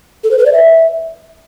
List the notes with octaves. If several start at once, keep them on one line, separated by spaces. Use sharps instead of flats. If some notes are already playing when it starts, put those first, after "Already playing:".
A4
C5
B4
D5
E5